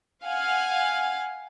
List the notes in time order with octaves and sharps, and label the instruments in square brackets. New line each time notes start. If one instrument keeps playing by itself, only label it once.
[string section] F5 F#5 G#5